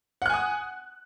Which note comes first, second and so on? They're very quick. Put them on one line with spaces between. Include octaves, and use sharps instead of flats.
F#5 F#6 G#5 D#6